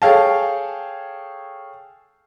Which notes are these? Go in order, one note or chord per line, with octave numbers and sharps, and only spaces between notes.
G#4 A4 C#5 F5 G5 A5